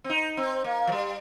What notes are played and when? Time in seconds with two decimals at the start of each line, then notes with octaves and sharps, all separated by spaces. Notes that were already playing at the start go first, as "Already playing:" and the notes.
0.04 C4
0.10 D#4
0.37 C4
0.64 A#3
0.87 F3
0.92 G3